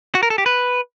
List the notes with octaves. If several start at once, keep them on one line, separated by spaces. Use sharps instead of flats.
F#4
A#4
A4
G4
B4